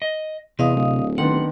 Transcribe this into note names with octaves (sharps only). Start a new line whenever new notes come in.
D#5
E2 C3 D#5 F5 D#6
D1
D#3 B3 D4 F#5 C6